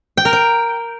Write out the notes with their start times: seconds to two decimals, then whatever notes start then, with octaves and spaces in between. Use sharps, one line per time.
0.17 G5
0.25 A#4
0.33 G5